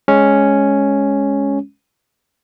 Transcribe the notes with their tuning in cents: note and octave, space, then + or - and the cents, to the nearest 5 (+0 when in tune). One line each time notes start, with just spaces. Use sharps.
G#3 +0 C#4 +0